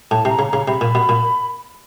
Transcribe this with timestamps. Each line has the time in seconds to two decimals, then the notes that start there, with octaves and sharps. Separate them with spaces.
0.11 A2 A5
0.25 C3 A#5
0.39 C#3
0.49 C#3 A#5
0.67 C3 B5
0.81 A#2
0.95 B2
1.09 A#2